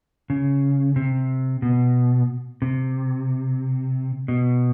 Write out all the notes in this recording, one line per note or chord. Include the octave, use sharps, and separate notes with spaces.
C#3
C3
B2
C3
B2